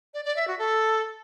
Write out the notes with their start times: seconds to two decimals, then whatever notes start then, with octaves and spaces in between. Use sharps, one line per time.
0.14 D5
0.25 D5
0.36 E5
0.48 F#4
0.59 A4